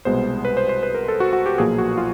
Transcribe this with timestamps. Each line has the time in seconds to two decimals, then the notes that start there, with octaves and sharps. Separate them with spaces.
0.05 C2 B2 G#3 B3 C5
0.45 B4
0.57 C5
0.69 C5
0.83 B4
0.95 A#4
1.08 A4
1.20 F#4
1.33 F#4
1.46 G4
1.58 B1 A#2 F3 A#3 G#4
1.78 F#4
1.98 F4